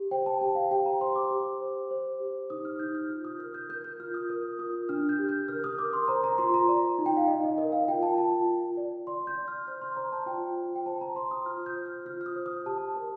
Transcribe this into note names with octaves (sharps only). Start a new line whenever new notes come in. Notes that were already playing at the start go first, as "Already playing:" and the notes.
Already playing: G4
C5 G5
A5
G4 G5
F5
G4 G5
A#5
C5 C6
D6
G4
C5
C5
G4
D#4 D#6
F6
D#4 G6
F6
F4 F6
D#6
A#4 F6
G6
A#4 G6
G6
F4 F6
D#6
A#4 D#6
F4 D#6
D4 F6
G6
G4
G6
A#4 F6
D#6
A#4 D6
C6
C5 A#5
A#5
F4 C6
A#5
D5
D#4
G5
F5
D#4 D#5
D#5
A#4 D#5
F5
F4 G5
A5
F4 A5
F4
D5
D5 C6
G6
D5
F6
C5 F6
C6
C5 A#5
A5
F4 G5
F4
G5
C5 A5
A#5
C5 C6
D#6
F4 F6
G6
C5
F6
F4 F6
F6
D#6
C5
D#6
G4 A5
A#4